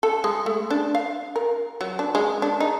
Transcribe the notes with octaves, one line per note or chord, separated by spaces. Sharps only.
A4
G#3
A3
D4
F5
A#4
F#3
D4
G#3
D4
D#4